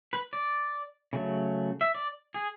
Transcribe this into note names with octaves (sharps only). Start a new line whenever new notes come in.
B4
D5
C#3 F#3 A3
E5
D5
G#4